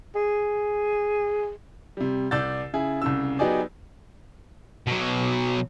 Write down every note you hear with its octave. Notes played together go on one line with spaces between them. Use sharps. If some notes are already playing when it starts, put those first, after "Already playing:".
G#4
C3 G3
C2 D5 E6 G6 A6
C#3 E4 G#4
C2 C#3 E6
F#3 B3 D#4 G4 G#4 D5
B2 F#3